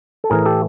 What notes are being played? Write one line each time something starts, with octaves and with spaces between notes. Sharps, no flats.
A4
A2 E3 G#4 A#4
G4 A4